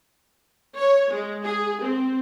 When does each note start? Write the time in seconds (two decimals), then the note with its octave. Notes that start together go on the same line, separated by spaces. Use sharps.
0.78 C#5
1.12 G#3
1.43 G#4
1.82 C4